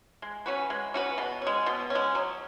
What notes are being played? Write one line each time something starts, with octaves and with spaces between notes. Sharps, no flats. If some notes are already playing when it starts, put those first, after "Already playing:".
G#3
C#4 F#4 B4
G#3
C#4 F#4 B4
B2
C#4
G#3
B2
C#4
G#3
F#3